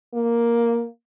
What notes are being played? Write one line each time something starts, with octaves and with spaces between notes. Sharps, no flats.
A#3